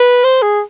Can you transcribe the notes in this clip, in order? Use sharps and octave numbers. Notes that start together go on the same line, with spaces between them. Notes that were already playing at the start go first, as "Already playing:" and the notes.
Already playing: B4
C5
G#4